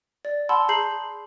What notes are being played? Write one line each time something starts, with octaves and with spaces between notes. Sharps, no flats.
D5
F#5 A5 B5 C6 E6
G#4 A#5 G6 C7 F#7